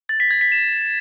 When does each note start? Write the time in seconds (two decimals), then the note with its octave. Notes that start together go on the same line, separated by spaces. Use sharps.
0.09 A6
0.20 B6
0.31 G#6
0.41 B6
0.52 E7